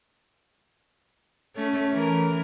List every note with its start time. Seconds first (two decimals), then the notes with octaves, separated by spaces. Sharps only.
1.55 A3 C#4
1.93 E3 A#4